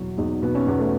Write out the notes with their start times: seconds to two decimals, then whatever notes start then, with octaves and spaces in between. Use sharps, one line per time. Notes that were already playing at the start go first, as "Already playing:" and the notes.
Already playing: E2 B2 F#3 E4
0.18 E2 D#4
0.42 B2 B3
0.55 C#4
0.67 E2 B3
0.79 A3